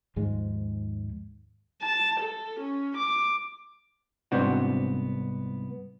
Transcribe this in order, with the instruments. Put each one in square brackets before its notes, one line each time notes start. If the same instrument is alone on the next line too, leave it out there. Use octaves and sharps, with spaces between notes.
[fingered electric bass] D#2 G#2 F3 G#3
[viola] A5
A4
C#4
D6
[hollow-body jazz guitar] C2 G#2 B3 C4 D4 F#4